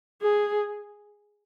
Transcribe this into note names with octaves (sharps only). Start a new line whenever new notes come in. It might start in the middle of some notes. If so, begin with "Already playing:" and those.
G#4